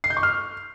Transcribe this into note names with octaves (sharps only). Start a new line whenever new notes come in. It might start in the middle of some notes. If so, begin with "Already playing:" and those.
C7
G6
C#6
F6